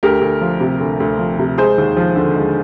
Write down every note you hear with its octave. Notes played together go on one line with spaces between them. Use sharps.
D2 G4 A#4
D2
F3
C3
D2
D2
F3
C3
G#3 G#4 C5
D#2
F3
D3
G#3